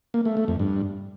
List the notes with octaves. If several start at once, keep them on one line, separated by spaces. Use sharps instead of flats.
A#3
A3
A3
F2
G2